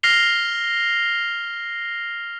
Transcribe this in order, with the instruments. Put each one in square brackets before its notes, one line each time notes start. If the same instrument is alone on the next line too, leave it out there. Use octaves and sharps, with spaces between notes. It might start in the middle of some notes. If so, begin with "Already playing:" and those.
[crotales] F6 A#6 C7 F7 G7